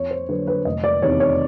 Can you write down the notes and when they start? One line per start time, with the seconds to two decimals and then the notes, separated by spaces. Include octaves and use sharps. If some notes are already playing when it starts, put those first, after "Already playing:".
Already playing: F2 C#5
0.11 C5
0.29 D3 F#3 B4
0.47 B4
0.65 F1 D#5
0.84 D5
1.02 E2 C3 D#3 C#5
1.20 C#5